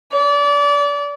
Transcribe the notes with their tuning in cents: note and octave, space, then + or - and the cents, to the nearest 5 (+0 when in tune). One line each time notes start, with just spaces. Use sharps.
D5 -30